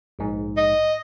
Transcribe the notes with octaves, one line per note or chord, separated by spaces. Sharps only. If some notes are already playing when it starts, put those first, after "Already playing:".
A#1 G#2
D#5